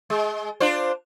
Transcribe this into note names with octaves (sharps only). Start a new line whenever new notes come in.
G#3
D4 F4 C5